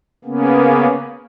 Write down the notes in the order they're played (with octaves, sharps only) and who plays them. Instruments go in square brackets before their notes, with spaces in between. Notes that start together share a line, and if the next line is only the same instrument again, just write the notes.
[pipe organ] C#3 A#3 B3 C#4